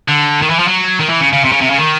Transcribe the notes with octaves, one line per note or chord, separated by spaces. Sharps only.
D3
D#3
E3
F3
F#3
D#3
E3
C#3
C#3
C3
C#3
C3
C#3
D#3